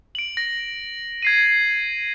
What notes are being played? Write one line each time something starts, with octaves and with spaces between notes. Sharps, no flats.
D7 F#7
A#6
G#6 C7 D#7